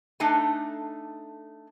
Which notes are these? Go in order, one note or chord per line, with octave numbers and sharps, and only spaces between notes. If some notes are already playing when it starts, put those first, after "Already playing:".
A3 D4 D#4 A4 G#5